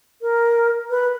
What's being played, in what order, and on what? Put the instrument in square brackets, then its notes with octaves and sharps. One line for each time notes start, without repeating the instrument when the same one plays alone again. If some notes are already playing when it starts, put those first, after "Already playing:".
[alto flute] A#4
B4